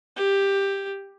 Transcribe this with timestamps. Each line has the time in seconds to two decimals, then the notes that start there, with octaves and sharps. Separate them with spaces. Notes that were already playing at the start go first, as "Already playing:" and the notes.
0.16 G4